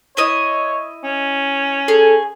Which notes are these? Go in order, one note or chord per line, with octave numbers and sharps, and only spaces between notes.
E4 C#5 D#5
C#4
G#4 A4